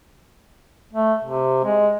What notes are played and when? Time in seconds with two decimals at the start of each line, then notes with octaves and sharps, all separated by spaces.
0.93 A3
1.24 C3
1.65 G#3